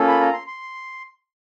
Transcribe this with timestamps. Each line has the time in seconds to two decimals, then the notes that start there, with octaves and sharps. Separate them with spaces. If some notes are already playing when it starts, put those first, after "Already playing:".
Already playing: A#3 C#4 F4 A4
0.08 B5
0.21 A#5
0.34 C6
0.47 C6